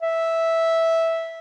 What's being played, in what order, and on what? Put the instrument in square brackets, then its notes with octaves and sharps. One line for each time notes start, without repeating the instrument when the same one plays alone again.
[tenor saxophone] E5